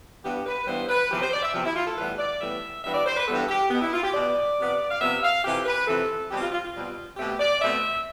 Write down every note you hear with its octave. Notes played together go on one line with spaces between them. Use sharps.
G2 E3 G3 B3 G4
B4
G2 E3 G3 B3 C5
B4
E2 C3 F3 C4 G4
C5
D5
E5
E2 C3 F3 C4 G4
E4
F4
A4
A2 E3 G3 B3 B4
D5
A2 E3 G3 B3 E5
G2 E3 G3 B3 E5
D5
C5
B4
G2 E3 G3 B3 A4
G4
B2 B3
E4
F4
G4
B2 B3 D5
C3 F3 B3
F5
C3 F3 B3 E5
F5
F2 C3 E3 G4
B4
F2 C3 E3 A4
B2 G3 C4 G4
F4
F4
F4
B2 G3 C4
B2 A3 C4 G4
D5
B2 A3 C4 E5